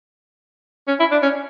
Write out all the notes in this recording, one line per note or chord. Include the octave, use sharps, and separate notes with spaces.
C#4
E4
D4
C#4